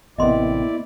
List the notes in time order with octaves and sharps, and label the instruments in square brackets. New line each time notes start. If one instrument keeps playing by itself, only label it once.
[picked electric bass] A1 C3 [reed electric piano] A#3 B3 [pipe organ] E4 D5 [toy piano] D#5 C6